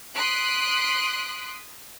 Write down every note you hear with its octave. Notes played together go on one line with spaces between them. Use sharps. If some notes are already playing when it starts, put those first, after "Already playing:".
C6 D#6 F#6 B6 D7